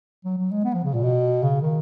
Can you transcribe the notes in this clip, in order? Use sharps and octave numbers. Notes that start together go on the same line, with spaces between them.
F#3
F#3
G#3
B3
F3
C#3
A#2
B2
C#3
D#3